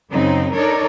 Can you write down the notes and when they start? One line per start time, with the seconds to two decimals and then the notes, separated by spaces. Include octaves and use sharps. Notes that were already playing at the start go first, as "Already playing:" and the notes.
0.12 F#2 C#3 F#3 C4 D#4
0.54 D4 D#4 A4 A#4 C#5 D5